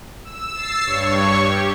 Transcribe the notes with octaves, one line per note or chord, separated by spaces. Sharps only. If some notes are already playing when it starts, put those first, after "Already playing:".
E6
E6 A6 C7
G2 C#5 C#6
G4